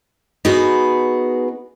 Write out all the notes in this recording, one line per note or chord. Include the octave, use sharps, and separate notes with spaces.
B3 D#4 F#4 G#4 B4